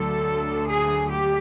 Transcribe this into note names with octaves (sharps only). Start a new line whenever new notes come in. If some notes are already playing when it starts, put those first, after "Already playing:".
Already playing: D2 D3 F#3 A4
G#4
G4